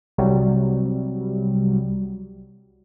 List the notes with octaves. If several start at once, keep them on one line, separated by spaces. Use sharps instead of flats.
C2 C3 F#3 G3